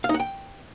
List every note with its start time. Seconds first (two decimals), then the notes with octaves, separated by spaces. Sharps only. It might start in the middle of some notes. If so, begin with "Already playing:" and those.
0.04 F5
0.09 D#4
0.14 F#5
0.20 G5